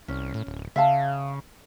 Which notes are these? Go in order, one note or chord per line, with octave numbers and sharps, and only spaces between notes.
C2 C#4
A2
D1
C#3 E5 F5 A5